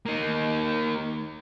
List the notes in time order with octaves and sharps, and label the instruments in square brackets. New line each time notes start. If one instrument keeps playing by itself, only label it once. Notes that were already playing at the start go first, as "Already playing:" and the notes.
[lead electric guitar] A#3 D#4